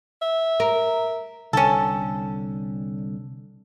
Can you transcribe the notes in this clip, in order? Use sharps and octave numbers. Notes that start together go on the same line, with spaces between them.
E5
A#4
C2 D3 C#4 A4 G5